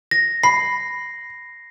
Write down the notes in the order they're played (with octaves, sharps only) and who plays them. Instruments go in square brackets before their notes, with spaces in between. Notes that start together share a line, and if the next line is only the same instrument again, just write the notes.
[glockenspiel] A#6
[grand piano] B5 [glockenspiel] C7